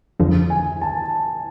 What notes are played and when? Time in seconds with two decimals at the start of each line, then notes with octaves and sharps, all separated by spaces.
0.20 F2 D3 F3
0.50 G#5
0.81 A5